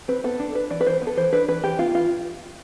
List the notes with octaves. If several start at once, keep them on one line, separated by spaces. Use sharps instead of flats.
C4 B4
B3 A4
D4
D4 B4
E3 D5
B4
E3 C5
B3
A4
E3 C5
D4 B4
E3 B4
E3 G4
B3 F4
E3 F4